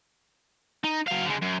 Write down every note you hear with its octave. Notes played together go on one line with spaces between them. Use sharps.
D#4
F#3 F5
D3 G#3
F#2